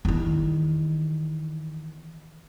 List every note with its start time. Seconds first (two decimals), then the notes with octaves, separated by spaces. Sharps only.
0.05 E2 D#3